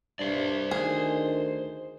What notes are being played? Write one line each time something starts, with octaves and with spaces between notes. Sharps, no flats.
G2 C5 D5
D2 D#3 G#4